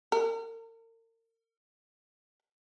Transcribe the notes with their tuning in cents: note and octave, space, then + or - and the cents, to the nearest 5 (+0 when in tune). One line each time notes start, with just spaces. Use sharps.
A#4 -40